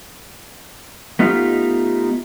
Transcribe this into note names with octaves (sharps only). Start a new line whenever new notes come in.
A3 B3 D#4 F4 G4